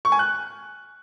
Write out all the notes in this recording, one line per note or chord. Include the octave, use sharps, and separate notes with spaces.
C#6
G#5
F#6